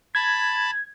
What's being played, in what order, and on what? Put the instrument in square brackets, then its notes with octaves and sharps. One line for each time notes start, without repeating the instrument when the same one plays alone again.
[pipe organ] A5 B5 [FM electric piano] G#6